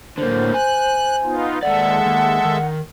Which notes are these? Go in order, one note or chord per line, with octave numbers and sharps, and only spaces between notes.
A2 D3 F#3 A#3 C5
G#5 F#6
B3 D#4 F4
D#2 G#3 A4 D5 E5 F#5
D#2
D#3